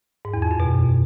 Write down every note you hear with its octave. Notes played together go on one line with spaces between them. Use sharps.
G#2
E2
F2
F#2
B2